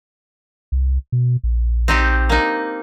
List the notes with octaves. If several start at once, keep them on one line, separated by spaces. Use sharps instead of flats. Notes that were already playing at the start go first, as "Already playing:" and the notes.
C2
B2
A#1
C4 D#4 G4
A#3 D#4